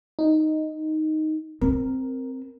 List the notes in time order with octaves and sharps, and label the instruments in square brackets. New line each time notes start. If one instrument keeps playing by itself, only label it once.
[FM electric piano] D#4
[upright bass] C4 [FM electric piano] A#4